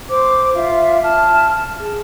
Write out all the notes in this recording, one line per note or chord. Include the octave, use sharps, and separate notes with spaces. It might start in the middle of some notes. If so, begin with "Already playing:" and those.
C5 D6
F4 E5 F5
A5 F6
G#4